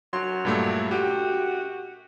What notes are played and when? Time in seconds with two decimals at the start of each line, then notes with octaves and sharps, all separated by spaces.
0.13 F#3 C6
0.45 G2 A#2 A3
0.91 F#4 G4 G5